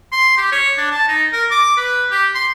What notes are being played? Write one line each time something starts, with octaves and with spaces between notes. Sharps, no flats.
C6
G4
C#5
D4
A5
D#4
A#4
D6
B4
G4
C6